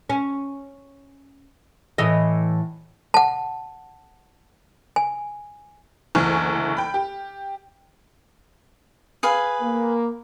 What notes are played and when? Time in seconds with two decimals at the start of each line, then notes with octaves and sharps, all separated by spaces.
0.10 C#4
1.98 A2 E3 D#5
3.14 F#5 A5
4.96 G#5
6.15 F#1 D2 E3 G#5 C#6 F6
6.77 G5 B5
6.94 G4
9.23 G#4 B4 F5
9.62 A#3